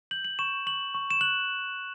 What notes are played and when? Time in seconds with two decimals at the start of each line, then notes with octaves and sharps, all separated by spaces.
0.11 G6 F#7
0.25 F#7
0.39 C#6 E7
0.66 C#6 F#7
0.95 C#6
1.11 E7
1.21 F#6 F#7